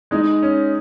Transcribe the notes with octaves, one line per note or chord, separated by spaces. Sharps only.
G#3 D#4
C#4